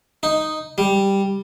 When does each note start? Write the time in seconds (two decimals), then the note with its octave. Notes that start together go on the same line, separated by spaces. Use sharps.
0.23 D#4
0.78 G3